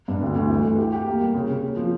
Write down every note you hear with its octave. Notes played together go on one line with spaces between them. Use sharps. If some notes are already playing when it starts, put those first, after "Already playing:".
G2
D2
D2
E3
A3
G4
G4
A#3
G3
C#3
C#3
A#3
F3